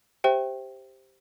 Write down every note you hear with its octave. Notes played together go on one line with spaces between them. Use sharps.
G4 C5 E5 G5